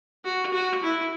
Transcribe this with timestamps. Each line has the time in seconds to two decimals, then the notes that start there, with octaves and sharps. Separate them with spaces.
0.25 F#4
0.53 F#4
0.83 E4